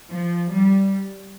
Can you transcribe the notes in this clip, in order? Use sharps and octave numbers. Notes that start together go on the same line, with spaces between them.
F3
G3